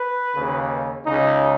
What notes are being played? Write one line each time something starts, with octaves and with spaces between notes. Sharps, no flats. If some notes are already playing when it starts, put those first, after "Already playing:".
Already playing: B4
D#2 C#3
C#2 C#3 D#4